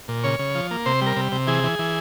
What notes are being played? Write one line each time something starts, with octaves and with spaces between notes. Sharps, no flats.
A#2
C#3 C#5
C#3
F3
A#3
C3 C5
G3 A#4
C3
C3
E3 G#4
E3
E3